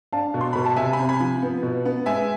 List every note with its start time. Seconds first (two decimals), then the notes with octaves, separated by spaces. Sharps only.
0.13 D4 F5 A5
0.34 B2
0.41 C6
0.53 B2 B5
0.65 A5
0.76 C3 E5 G#5
0.93 G#5 B5
0.98 C4
1.09 G#5 B5
1.20 F3
1.42 B3
1.63 B2
1.85 B3
2.06 G#3 E5 G#5